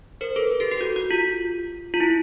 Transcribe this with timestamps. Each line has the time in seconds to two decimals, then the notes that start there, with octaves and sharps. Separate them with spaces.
0.21 A#4 C5
0.36 A4 B4
0.60 G4 A4
0.71 G4
0.81 F#4
0.96 F#4
1.11 F4
1.94 F4
2.00 E4